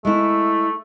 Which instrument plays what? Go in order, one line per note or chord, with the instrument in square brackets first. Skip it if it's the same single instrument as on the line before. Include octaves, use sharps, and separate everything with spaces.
[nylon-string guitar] G#3 E4 [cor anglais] A3